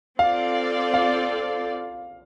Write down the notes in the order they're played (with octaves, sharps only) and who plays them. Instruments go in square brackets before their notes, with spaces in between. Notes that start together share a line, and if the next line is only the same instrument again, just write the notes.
[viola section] C4 F4 A4 D5 [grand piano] F5
[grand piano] F5